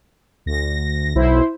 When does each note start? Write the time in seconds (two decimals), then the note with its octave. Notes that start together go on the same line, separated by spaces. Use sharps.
0.46 D2 A#6
1.16 B1 E4 C5